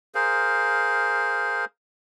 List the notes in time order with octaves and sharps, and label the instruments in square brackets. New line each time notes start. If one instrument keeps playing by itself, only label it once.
[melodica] G#4 A#4 C5 F5